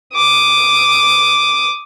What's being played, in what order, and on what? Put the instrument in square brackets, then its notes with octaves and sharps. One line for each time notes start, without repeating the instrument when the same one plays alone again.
[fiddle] D6 D#6